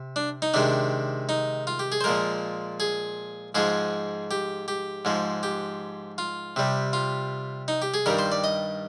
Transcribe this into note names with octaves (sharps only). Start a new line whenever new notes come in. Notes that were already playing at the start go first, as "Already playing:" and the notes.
Already playing: C3
D4
D#4
C3 D#3 G#3 D4
D#4
F4
G4
G#4
C5
A#2 F3 G#3 A#4
G#4
G#2 F3 G#3 G#4
G4
G4
G#2 F3 G#3
G4
F4
C3 G3
F4
D#4
G4
G#4
G2 D#3 G3 A#4
C5
D5
D#5